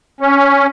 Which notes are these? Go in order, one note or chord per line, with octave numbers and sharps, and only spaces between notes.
C#4